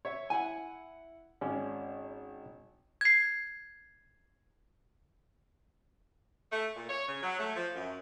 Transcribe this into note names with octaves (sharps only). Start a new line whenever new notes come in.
C#5 E5
E4 F#5 G#5
G#1 C#4 D5
G#6 C7
A3
A#2
C#5
C#3
F#3
A3
F3
F#2